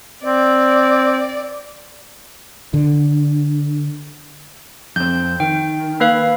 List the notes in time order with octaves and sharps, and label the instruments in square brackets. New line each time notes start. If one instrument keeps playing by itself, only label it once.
[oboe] C4 [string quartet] D5
[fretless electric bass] D3
[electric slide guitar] F2 C4 [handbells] G6
[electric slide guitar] D#3 [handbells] G5
[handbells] A#3 B4 F5